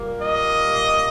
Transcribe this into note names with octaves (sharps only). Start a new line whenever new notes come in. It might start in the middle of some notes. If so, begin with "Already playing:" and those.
Already playing: A#2 G3 A#3
D#5